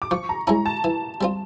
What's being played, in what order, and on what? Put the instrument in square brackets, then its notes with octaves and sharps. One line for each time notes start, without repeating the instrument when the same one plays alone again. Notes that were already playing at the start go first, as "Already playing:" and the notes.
[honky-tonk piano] D6
[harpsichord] F3 [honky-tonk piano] C#6
[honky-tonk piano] A#5
[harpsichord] G#3 C#4 E4 [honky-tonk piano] A#5
[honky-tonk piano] A5
[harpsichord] E3
G3 C4 F4